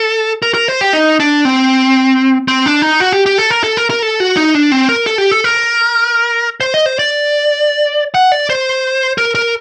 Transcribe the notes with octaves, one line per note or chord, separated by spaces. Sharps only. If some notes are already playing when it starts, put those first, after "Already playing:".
Already playing: A4
A#4
A#4
C5
G4
D#4
D4
C4
C4
D4
D#4
F#4
G4
G4
A4
A#4
A4
A#4
A#4
A4
F#4
D#4
D4
C4
A#4
A4
G4
A4
A#4
C5
D#5
C5
D5
F#5
D5
C5
A#4
A#4